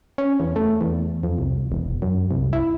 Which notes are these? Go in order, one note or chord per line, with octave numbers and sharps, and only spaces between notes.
C#4
E2
A3
E2
F2
C2
E1
F#2
C2
E4